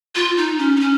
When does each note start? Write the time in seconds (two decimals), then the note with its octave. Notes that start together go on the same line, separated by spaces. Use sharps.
0.15 F4
0.37 D#4
0.58 C#4
0.76 D#4
0.80 C#4